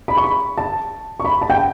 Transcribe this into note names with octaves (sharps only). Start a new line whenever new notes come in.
B5
C#6
B5
A5
C#6
B5
A5
G5